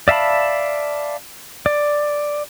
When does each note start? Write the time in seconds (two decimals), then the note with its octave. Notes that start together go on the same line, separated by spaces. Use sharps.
0.08 D5 E5 F5 A5 B5
1.66 D5